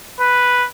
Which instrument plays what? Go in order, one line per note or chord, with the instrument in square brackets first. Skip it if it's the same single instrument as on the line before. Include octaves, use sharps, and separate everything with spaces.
[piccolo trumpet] B4